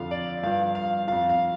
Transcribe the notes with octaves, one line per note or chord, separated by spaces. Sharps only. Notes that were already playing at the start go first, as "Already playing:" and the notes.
Already playing: F2 D3 F3 F5
D5
G2 F3 F5
F5
F2 F3 F5
F5